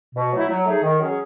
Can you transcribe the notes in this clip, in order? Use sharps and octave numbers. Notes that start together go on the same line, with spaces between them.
B2
F#3 A3 E4
F#3
A3 D#4 G#4
D#3
F#3 C#4 G#4